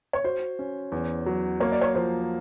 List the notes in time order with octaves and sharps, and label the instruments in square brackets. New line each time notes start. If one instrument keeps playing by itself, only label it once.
[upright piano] C#5
[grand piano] F#4 [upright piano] C5
[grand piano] C#4
E2
F#3
[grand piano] A#3 [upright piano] C#5
[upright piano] D5
C#5
[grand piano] F3 [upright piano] C5